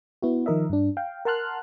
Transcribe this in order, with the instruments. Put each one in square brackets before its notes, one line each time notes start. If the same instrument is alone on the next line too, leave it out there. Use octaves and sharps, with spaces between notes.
[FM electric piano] B3 E4 F#4
D#3 F3 A#4 D#5 E5
G2 D4
F5 G5
A#4 F#5 A5 C6 F6 F#6